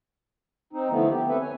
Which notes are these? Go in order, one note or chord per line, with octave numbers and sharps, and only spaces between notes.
C4 D#4
D3 E3 F3 A3 B3
G4
C4 A4 B4 E5
C#5 G#5